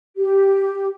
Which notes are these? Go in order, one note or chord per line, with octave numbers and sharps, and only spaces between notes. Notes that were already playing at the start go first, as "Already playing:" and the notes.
G4